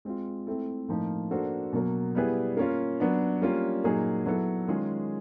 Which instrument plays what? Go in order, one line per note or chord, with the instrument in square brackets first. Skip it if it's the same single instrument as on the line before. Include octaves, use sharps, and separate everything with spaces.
[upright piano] G#3 C4 F4
A3 C4 E4 A4
A2 F3 A#3 D#4
A#3 D4 F#4 A4 C5
B2 F#3 A#3
G3 B3 E4 G#4 B4
A#3 C#4 F4
F#3 B3 D4
G3 A#3 C#4 F4
A#2 F#3 A#3 D#4 G#4
F#3 B3 E4 A4
D#3 G#3 C#4 F4 G#4